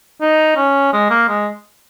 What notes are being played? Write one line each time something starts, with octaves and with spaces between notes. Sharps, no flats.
D#4
C#4
G#3
A#3
G#3